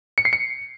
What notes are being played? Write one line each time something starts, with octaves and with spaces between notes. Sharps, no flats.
C#7
C7
C#7